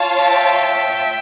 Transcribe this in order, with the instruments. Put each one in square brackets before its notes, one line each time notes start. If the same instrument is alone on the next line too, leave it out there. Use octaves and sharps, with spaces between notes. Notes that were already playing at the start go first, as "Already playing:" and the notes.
Already playing: [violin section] F4 C#5 F5 A5
[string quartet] E5 G5